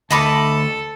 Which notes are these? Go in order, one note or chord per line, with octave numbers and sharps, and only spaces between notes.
D2 A4 D#5 A5 B5 D6